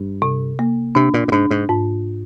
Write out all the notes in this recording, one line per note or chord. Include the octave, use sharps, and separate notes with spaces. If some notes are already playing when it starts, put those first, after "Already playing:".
Already playing: G2
C3
A#3
C3 D4
A#2
A#2
G#2 D4
G#2
G#2